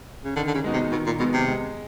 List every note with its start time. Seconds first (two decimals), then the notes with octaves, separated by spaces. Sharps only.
0.24 C#3
0.36 D3 D#3
0.47 D3
0.54 C#3
0.64 G#3 B3 D#4 F#4
0.73 C3
0.91 B2 D#3
1.06 A#2
1.19 B2 G#3 B3
1.33 C3
1.47 G#3